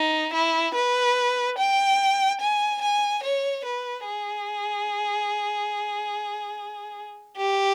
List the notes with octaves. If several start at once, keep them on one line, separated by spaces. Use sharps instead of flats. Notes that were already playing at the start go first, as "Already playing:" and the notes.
Already playing: D#4
E4
B4
G5
G#5
G#5
C#5
B4
G#4
G4